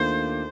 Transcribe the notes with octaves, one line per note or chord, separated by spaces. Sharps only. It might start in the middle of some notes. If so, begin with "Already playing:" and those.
Already playing: D#2 D#3 A3 D4 F4 C5